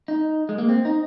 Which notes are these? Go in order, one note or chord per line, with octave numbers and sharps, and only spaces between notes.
D#4
G#3
A#3
C4
D#4